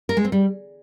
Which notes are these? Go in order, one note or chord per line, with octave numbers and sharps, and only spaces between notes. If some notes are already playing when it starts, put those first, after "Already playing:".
A#4
G#3
C4
G3